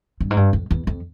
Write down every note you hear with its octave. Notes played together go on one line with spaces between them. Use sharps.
G2
G#2
G2
F2
E2
F2